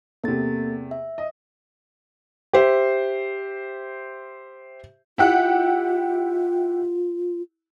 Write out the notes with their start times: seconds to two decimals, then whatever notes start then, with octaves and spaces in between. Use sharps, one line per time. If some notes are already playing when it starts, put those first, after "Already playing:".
0.24 E2 C3 A#3 A4 A6
0.91 E5
1.18 D#5
2.53 G4 C5 E5
5.18 E4 F4 G4 F#5